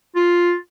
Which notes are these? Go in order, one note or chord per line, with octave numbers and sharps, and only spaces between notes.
F4